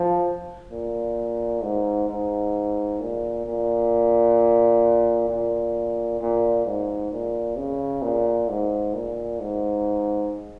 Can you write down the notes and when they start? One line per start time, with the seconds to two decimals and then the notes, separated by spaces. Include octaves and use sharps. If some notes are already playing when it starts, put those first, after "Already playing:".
Already playing: F3
0.72 A#2
1.63 G#2
2.09 G#2
3.00 A#2
3.46 A#2
5.28 A#2
6.20 A#2
6.66 G#2
7.11 A#2
7.57 C#3
8.02 A#2
8.48 G#2
8.94 A#2
9.40 G#2